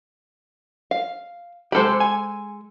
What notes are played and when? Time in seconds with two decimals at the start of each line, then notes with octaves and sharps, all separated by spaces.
0.91 F5
1.72 G#3 G4 A4 C5 B5
2.00 G#5